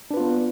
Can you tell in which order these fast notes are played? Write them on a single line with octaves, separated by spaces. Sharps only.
D4 B4 F4 B3